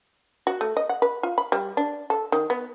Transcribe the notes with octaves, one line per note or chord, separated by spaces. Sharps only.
F#4
A3
D#5
F#5
B4
F4
B5
G3
D4
A4
D#3
B3